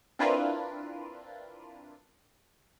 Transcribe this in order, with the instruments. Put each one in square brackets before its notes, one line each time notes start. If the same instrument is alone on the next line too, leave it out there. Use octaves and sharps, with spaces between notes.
[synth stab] C4 D4 E4 F4 A#4 B4